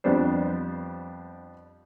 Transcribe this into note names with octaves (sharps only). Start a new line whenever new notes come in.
F2 G3 B3 D4 C5